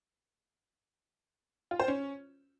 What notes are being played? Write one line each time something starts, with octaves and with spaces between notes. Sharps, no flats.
F4
C5
C#4